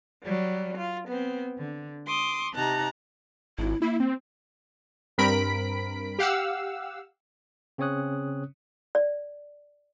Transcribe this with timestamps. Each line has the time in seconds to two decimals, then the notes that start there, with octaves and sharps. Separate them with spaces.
0.23 F#3 G3
0.77 F4
1.08 B3 C4
1.58 D3
2.08 C6 D6 D#6
2.54 C3 D#4 G4 A5 A#5 F#6
3.58 G#1 E4
3.82 A#3 E4
4.00 C4
5.18 G2 C4 A#4 B5 B6 D7
6.19 G4 F5 F#5 E6
7.78 C#3 C4 C#4 C#5 D#6 F#6
8.95 D5